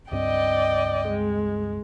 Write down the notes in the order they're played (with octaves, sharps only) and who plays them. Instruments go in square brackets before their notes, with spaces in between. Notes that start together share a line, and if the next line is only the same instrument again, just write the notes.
[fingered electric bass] C#2 G2 C4 [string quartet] D5 D#5 G5
[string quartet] G#3